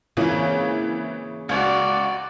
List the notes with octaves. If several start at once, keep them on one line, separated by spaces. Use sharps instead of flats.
G#1 C#3 E3 A#3
C#2 F#4 D5